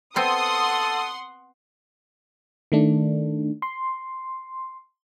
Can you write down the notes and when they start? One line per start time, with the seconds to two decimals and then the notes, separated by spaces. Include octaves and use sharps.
0.16 B3 C4 A4 F#5 C6 D#6
2.72 D#3 A3 D4
3.62 C6